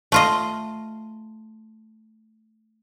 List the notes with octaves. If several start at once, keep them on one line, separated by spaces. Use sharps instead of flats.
A3 F4 D#5